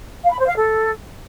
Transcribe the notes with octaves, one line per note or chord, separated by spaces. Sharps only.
F5
B5
C5
F5
A4